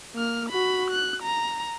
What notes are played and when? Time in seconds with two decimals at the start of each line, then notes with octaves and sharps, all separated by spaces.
0.15 A#3 F6
0.49 F#4 B5
0.90 F#6
1.22 A#5